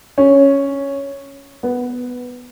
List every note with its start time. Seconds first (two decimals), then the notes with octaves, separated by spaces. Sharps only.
0.18 C#4
1.63 B3